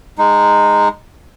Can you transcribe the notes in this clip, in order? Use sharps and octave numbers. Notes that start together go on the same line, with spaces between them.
G#3 D#4